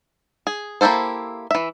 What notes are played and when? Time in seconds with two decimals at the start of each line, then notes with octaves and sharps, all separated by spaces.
0.47 G#4
0.81 A#3 E4 G4 A4 C5
1.51 E3 E5